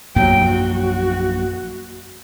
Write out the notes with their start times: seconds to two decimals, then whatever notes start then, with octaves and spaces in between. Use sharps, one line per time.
0.16 A#1 F#2 F#3 A#3 G5
0.45 F#4